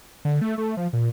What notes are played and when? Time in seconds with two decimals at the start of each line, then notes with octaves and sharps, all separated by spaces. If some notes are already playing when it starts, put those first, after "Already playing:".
0.25 D3
0.41 A3
0.58 A3
0.77 F3
0.93 A#2